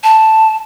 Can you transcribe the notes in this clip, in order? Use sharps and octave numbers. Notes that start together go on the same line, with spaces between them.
A5